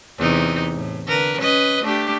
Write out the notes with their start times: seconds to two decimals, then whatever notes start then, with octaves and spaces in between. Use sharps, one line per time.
0.18 E2 C3 D#4
0.73 A2
1.08 D3 A#4 B4
1.40 C#4 B4 D#5
1.83 A3 D4 G4